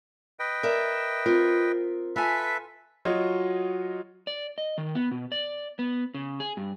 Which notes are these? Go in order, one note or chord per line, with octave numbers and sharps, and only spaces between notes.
B4 D#5 G5
A#4 D5 E5
C4 F4 A#4
F4 A4 B4 E5 G#5
F#3 F4 F#4 C#5 D#5
D5
D#5
D#3
B3
B2
D5
B3
C#3
G#4
G2